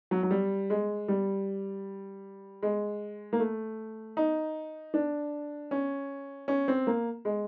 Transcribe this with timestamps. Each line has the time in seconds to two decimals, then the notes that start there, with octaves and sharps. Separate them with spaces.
0.11 F#3
0.23 F#3
0.31 G3
0.70 G#3
1.08 G3
2.63 G#3
3.33 A#3
3.40 A3
4.17 D#4
4.94 D4
5.71 C#4
6.48 C#4
6.68 C4
6.87 A#3
7.25 G#3